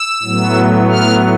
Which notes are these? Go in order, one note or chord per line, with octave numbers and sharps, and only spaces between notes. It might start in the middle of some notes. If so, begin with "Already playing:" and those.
Already playing: E6
A2 F#3 B3
F6